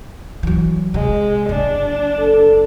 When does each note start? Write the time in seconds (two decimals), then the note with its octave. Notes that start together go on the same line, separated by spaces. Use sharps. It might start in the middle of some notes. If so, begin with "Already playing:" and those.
0.43 E3 F#3
0.94 C3 G#3
1.49 F#1 D4
2.19 A4